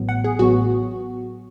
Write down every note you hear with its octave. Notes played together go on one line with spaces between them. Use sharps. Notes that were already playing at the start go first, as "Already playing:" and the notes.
Already playing: A1 A2 F#3 B3
F#5
G#4
A1 A2 F#3 B3 F#4